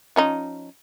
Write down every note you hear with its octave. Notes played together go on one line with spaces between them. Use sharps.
F3 C#4 D#4